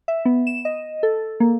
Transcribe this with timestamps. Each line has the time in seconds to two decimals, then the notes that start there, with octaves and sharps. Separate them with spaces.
0.08 E5
0.25 B3
0.47 E7
0.65 D#5
1.03 A4
1.40 A#3